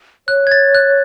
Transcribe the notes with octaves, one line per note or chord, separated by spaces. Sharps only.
C#5 F#6
G#6
A6
F#6